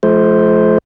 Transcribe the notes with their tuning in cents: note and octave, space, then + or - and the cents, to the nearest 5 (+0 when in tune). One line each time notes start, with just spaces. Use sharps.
F3 +0 A3 -40 C5 +0